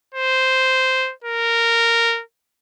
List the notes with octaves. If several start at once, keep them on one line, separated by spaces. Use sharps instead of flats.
C5
A#4